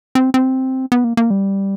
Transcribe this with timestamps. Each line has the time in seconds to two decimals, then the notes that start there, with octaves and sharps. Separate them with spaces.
0.15 C4
0.34 C4
0.92 B3
1.04 A#3
1.17 A#3
1.30 G3